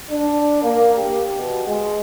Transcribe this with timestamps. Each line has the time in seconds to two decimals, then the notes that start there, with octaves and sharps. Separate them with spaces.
0.10 D4
0.62 A#3
0.96 G4
1.37 B2
1.66 G#3